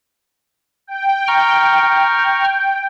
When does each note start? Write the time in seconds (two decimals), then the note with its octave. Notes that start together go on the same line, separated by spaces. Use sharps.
0.87 G5
1.28 A#5 C#6 F6